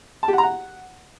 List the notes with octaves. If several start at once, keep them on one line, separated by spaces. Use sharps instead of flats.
A5
G4
F#5
A#5
F#5